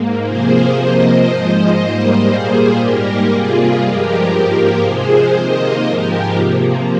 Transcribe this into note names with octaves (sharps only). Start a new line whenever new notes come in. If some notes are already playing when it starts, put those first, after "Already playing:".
Already playing: G#2 A#3
C3 F3 A#3 G#4 C5
C3 F3 A#3 C5 D#5
G#2 F3 G#3 C5 D#5
G#2 G3 A#3
A#2 G3 A#3 G#4 C5
G#2 G3 A#3 G4 A#4
C3 G3 A#3 F4 G#4
G2 F3 G#3 G4 A#4
G#2 F3 A#3
C3 F3 G#3 G#4 C5
C3 D#3 A#3 C5 D#5
G#2 F3 G#3 G4 A#4
C3 F3 A#3